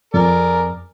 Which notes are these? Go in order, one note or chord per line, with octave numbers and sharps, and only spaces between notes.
F2 G#4 A#4 D5